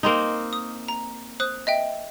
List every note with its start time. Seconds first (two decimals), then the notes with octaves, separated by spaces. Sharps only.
0.03 A#3 C4 D#4
0.53 D#6
0.88 A#5
1.40 C5 D#6 F#6
1.67 D#5 E5 G5